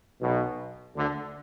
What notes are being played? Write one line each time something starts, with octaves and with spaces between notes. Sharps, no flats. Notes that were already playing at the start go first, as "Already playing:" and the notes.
B1 B2
D2 D3